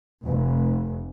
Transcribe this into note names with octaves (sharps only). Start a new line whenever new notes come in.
F1